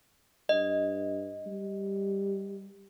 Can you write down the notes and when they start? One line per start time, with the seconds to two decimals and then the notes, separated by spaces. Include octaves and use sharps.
0.49 G2 D#5
1.46 G3